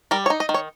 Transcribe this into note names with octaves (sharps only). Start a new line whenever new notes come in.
G3 A#4
C#5
D#4
D#5
D#3
C#5